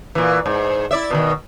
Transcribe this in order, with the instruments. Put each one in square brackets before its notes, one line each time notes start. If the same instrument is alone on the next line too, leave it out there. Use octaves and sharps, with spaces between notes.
[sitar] A#2 E3
G#2
E4 D5 E5
B2 D3 D#3